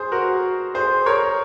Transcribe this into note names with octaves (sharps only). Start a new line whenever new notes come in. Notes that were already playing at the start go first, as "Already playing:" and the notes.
Already playing: G#4 C5
F#4 A#4
G#4 C5
A#4 C#5